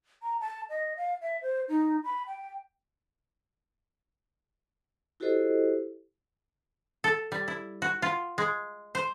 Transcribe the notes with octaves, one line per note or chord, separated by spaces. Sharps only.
A#5
A5
D#5
F5
E5
C5
D#4
B5
G5
E4 F#4 G4 A4 C5 D#5
A4
G3
E4
F#4
F4
G#3
C5